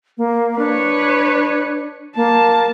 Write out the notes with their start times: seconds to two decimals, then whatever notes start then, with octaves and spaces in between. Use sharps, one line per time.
0.18 A#3
0.59 D4 B4 C#5
2.16 A#3 A5